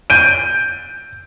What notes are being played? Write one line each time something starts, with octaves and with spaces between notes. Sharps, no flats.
G6 D7 D#7